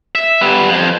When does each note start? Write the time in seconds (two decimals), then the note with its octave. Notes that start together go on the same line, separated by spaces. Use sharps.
0.15 E5
0.41 G3 B3
0.69 F2